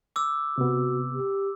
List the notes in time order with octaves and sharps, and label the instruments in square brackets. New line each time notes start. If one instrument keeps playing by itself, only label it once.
[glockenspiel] D6 E6
[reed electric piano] C3 B3 [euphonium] F#4
[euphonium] G4